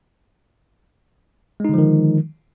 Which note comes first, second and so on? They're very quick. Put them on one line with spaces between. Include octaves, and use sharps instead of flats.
G#3 D#4 D3 F3 D#3